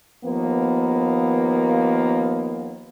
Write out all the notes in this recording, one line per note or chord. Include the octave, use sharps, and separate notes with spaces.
D#2 F3 A#3 B3